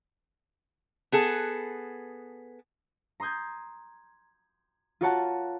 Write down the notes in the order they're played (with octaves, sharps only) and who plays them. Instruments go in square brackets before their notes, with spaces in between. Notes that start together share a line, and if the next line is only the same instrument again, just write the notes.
[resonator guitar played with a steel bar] B3 G#4 A4
[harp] A#5 C6 D#6 G6 G#6
F4 F#4 A#4 C#5 F#5 A5